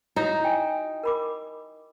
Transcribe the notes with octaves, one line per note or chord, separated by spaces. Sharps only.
D#4 E4 F#4 A#5
G5 G#5
A#4 B5 D6